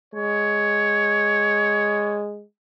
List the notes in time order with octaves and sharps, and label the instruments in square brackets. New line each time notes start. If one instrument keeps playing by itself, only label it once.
[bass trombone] G#3 [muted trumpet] C#5